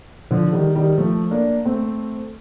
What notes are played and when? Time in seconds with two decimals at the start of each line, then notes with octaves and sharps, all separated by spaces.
0.31 D3 F3
0.53 D#3 G3
0.75 D#3 G3
0.98 F3 A3
1.31 A#3 D4
1.65 A3 C4